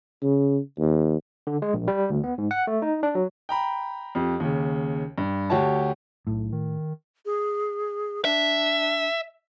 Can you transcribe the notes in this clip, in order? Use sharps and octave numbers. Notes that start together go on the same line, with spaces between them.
C#3
D#2
D3
G#3
A#1
G3
D2
B3
G#2
F#5
A3
D#4
D4
F#3
G5 A#5 B5
F2 G4
D#2 C#3
G2
D2 F#4 G4 C#5 A5
B1 A2
D#3
G#4
D4 E5